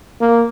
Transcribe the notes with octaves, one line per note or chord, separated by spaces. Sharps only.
A#3